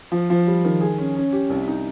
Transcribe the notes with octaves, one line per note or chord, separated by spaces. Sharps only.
F3
F3
G3
D#3
G#4
C#4
C#4
G4
C2
D#4